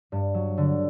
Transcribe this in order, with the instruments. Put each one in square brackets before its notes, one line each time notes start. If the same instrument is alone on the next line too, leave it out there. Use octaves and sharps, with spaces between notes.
[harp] G2
F#3
D3